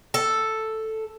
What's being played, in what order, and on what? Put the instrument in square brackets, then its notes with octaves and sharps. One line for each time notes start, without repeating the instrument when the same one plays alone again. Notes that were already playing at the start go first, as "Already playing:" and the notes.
[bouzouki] A4